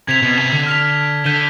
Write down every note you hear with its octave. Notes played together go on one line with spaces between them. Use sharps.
C3 G#6 B6 F7
B2
C3
D3
F6 B6 F7
D3 G6 B6 D#7 G7